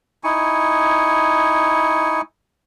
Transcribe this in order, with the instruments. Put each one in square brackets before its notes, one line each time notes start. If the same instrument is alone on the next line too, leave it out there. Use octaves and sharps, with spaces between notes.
[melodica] D#4 E4 G#5 C#6